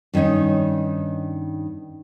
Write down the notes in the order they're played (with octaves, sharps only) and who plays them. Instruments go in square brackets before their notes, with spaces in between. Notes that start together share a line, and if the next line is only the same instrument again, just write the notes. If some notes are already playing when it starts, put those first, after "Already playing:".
[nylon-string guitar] G2 D#3 C#4 D#4 C#5